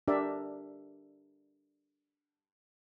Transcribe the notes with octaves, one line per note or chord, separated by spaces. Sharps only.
D4 G4 A#4 D5 E5